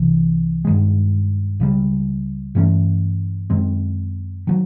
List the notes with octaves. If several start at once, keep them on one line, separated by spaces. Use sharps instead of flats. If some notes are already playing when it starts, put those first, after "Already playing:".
Already playing: C2 C3 E3
G2 D#3 G#3
C#2 C#3 E3 G3
G2 E3 A3 C#4
F#2 D#3 G#3 C4
D#3 F#3